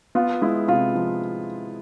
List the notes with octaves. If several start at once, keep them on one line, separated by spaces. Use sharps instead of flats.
B3 F4
G#3 E4
C3 F4
F3